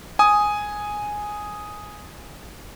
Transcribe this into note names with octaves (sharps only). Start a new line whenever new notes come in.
G#5 D#6